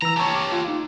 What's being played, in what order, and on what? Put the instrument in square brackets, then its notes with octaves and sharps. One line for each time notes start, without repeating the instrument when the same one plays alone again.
[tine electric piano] E3 E6 [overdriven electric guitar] A#5
[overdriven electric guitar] G4 C#5 [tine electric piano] A5 C#6
[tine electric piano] D6
F4
D#4